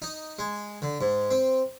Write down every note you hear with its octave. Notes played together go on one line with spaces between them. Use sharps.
D#4
G#3
D3
G#2
C4